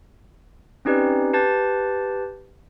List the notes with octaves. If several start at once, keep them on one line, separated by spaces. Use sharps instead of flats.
C4 C#4 D#4 G4 B4 D5
G4 B4 A5 G6 A6